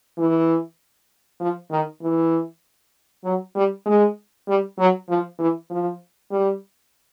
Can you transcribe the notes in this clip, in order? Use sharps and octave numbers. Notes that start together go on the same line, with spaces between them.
E3
F3
D#3
E3
F#3
G3
G#3
G3
F#3
F3
E3
F3
G3